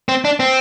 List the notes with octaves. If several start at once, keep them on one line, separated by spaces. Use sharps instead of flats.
C4
D4
C4